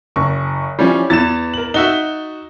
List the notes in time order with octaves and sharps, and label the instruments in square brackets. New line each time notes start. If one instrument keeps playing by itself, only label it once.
[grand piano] F#1 C#6
[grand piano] E3 F3 C#4 [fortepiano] G3
[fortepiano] E2 E3 [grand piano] A6 E7
[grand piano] A#4 F#7
[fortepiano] D#4 F#4 E5 [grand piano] G7